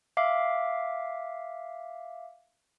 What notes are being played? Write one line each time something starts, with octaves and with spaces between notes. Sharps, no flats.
E5 F5 D6